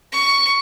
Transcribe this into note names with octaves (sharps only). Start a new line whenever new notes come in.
C#6